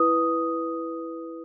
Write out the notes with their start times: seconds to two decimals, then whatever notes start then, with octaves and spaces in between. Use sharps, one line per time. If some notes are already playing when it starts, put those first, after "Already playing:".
Already playing: E4 B4 D#6